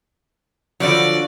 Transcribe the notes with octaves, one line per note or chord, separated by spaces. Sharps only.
D3 F3 F#3 D5